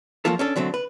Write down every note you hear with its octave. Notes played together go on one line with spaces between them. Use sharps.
F3 F#3 A#3 F4 A4
C#4 D4 A4
D3 F#3 A3 C4
B4